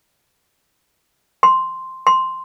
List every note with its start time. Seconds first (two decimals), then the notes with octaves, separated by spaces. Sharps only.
1.43 C6
2.07 C6